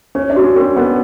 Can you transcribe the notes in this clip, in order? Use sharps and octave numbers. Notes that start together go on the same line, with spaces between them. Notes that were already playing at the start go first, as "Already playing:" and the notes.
C#4 C#5
D4
F#4
C#4
C4 A#4
B3 A#4